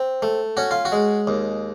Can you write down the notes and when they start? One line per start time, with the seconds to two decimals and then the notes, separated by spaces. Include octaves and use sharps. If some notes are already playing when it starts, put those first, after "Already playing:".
Already playing: C4
0.22 A3
0.57 C#4 F#4
0.71 F4
0.85 F#4
0.92 G#3
1.27 D#2